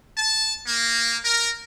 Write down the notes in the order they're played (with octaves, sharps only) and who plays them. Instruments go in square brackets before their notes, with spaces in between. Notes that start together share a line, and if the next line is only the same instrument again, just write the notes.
[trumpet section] A5
A#3
A#4